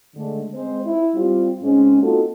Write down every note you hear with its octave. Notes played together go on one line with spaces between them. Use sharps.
G#2 D3 A3
G#3 C4 C5
E4
G3 C4 F4
G#2 G#3 C4 C#4
A#3 C4 D#4 F4 F#4 A4